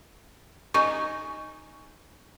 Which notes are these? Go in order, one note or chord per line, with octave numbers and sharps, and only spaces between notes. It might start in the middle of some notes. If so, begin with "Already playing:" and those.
D#4 G#5 C#6